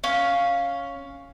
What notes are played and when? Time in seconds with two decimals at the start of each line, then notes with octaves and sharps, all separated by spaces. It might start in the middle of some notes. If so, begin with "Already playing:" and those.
0.04 C#4 F5